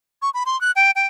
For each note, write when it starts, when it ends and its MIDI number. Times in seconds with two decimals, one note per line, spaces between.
0.22 0.30 85
0.34 0.44 83
0.46 0.59 84
0.61 0.71 90
0.76 0.91 79
0.96 1.07 79